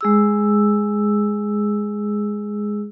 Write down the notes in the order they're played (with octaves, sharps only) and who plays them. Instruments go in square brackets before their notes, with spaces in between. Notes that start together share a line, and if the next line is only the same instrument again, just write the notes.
[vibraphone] G#3 G#4 E6